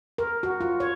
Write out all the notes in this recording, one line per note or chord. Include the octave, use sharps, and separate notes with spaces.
A#4
F#4
F4
C#5